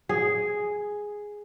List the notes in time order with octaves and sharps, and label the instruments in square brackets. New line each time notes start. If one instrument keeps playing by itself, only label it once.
[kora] G#4